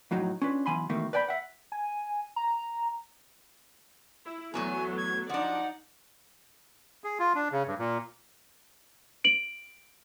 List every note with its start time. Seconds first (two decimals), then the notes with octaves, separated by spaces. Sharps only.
0.11 F2 A2 F#3 D#4
0.42 C#4 D4 F4 B4
0.66 B1 B2 E3 G#5 B5 C6
0.90 B2 D#3 E3 A3 A#3
1.13 B4 D5 G5 G#5 B5
1.28 E5 F#5
1.72 G#5
2.36 A#5
4.25 E4
4.54 E2 F#3 A3 B3 F#4 G#5 A#5
4.97 G#6
5.29 F3 D4 D#4 D5 F#5
7.04 G#4
7.19 F4
7.35 D4
7.51 C#3
7.67 G2
7.78 A#2
9.24 D7 F#7